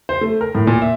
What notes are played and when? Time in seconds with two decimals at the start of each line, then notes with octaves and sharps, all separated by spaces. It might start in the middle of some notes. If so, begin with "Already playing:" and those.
0.09 C5
0.21 A3
0.41 A#4
0.55 A2
0.67 A#2
0.82 E5